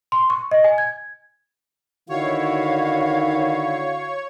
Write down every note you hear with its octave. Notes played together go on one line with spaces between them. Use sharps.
C6
C#6
D#5
G#5
G#6
D3 D#3 E4 F#4 C#5 F5